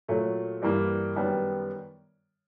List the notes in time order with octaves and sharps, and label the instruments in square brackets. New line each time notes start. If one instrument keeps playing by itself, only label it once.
[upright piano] A#2 F#3 A3
G2 E3 G3 A#3
F#2 D#3 G3 B3